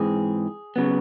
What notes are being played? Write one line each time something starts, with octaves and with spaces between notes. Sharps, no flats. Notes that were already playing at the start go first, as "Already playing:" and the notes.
Already playing: G#2 E3 G#3 C4 G#4
C#3 F#3 B3